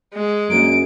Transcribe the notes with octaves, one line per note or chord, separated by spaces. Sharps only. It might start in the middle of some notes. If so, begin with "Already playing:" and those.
G#3
F#2 A#3 D4 D#4 D7